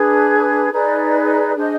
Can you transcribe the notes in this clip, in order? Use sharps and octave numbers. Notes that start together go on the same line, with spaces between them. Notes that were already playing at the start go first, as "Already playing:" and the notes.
Already playing: D4 G#4 B4
D#4 G#4 B4 D5
D4 G#4 C5 D#5